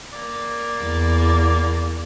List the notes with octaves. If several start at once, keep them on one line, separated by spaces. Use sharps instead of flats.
A#3 D5
E2